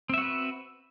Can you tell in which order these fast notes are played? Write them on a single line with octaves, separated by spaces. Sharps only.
C4 E5 F#4 B4